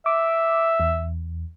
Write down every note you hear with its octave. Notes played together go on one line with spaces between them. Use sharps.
E5 D6
E2